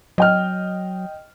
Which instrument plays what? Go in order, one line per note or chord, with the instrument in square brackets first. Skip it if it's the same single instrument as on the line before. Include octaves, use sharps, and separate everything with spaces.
[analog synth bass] F#3 [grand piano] D#5 G5 F6